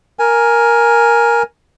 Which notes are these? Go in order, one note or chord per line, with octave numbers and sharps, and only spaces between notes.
A#4 G#5